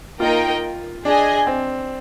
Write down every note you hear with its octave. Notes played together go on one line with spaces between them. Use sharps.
A#3 D#4 F4 A#4 D#5 G5
D4 G#4 D#5 G#5
C4